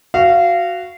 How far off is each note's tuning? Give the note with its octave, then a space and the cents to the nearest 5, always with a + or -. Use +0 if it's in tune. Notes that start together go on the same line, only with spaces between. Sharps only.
F#4 +0 F5 -25